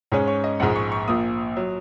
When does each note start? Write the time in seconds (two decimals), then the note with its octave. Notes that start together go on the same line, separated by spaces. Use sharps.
0.12 G#2 G#3 C#4 C#5
0.27 C#5
0.44 D#5
0.60 A#1 G#2 G#3 F#5
0.76 C#6
0.92 C#6
1.08 A#1 A#2 A#3 D#6
1.56 F#3